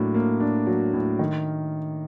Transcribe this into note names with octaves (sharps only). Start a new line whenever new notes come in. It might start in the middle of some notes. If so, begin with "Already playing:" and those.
Already playing: A2 F#3 A#3 D4
A#3
D4
F#3
A2
D#3